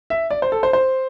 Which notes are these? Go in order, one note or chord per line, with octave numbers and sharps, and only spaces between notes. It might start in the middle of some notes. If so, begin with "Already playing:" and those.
E5
D5
C5
A4
C5
C5